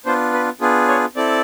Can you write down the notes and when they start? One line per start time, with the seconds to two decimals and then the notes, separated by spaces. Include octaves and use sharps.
0.05 B3 D4 F4 C5
0.33 B4
0.61 B3 D4 F4 G#4
0.89 C#5
1.16 C4 E4 A4 D5